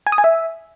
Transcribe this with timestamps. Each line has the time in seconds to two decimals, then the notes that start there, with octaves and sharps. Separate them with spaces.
0.07 G#5
0.12 D#6
0.18 G#5
0.24 E5